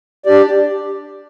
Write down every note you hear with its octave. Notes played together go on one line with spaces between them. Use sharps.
D4 G4 D5